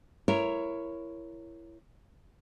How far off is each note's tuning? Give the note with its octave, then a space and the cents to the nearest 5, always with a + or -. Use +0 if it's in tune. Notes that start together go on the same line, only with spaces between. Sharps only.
E4 +20 A#4 +0 C#5 +0